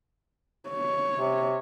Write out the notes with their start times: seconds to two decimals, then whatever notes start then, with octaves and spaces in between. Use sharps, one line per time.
0.70 C#5
1.18 C3